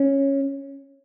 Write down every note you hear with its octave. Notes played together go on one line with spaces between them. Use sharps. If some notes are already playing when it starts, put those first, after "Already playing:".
Already playing: C#4